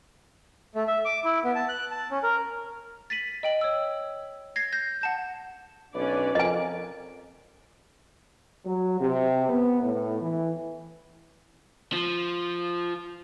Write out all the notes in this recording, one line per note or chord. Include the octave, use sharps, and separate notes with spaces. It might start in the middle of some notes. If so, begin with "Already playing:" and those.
A3
E5
D6
E4
B3
A5
F#6
A5
C#4
A#4
A6 B6 D#7 F#7
D#5 G5 F#7
C#5 E6
G#6 A#6 C7
G6 A#6
F#5 A5 G6
B1 C#4 D4 B4 D5
F2 A#4 D#5 G#5
F#3
C3
B3
A2
E3
F3